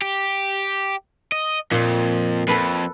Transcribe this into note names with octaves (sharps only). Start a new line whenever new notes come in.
G4
D#5
F2 A#2
F2 A4 B4